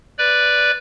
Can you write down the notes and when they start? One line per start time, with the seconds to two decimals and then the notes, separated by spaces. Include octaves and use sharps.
0.18 B4 D5